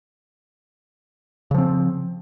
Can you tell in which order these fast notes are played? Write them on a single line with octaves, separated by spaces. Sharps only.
C#3 F3 C4